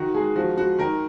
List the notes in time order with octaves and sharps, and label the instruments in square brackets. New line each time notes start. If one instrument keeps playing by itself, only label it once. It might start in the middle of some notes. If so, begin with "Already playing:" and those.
Already playing: [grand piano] D#3 F#4
G#3 G#4
F3 F#4
G#3 F#4
D#3 A#4